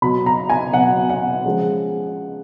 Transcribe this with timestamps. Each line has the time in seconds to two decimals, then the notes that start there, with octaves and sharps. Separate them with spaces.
0.02 B2 F#3 B5
0.26 A#5
0.50 G#5
0.73 B2 F#3 F#5
1.10 F#5
1.45 C#3 F3 G#3